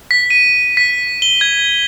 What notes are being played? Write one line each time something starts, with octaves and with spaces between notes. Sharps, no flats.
B6
D#7
B6
G7
G#6